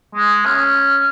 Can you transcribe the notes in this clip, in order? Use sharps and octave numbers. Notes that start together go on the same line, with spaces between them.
G#3
C#4